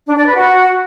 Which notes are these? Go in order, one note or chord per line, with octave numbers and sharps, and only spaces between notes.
D4
D5
B4
F#4